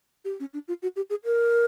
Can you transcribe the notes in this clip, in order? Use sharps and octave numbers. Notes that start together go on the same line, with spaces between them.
G4
C#4
D4
F4
F#4
G4
G#4
A#4